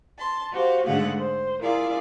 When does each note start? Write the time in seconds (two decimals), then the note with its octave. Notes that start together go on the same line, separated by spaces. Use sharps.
0.19 A5 C6
0.53 F#4 G4 C5 F5
0.86 G#2 D3 A3 G#4 F5 F#5
1.18 C5
1.62 E4 F4 G#4 A#4 D5 F5